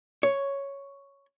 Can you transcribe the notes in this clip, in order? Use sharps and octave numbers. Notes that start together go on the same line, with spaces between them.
C#5